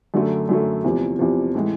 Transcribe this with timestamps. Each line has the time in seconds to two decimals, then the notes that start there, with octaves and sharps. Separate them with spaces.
0.14 F#2 D3 F#3 A3
0.49 F#2 D3 F#3 A3
0.84 E2 C3 F3
1.19 E2 C3 F3
1.55 A2 E3 G#3